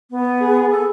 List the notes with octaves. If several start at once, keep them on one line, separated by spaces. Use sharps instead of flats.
B3
G#4
A4